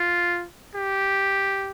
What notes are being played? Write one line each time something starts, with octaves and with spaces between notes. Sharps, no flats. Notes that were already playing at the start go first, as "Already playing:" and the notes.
Already playing: F4
G4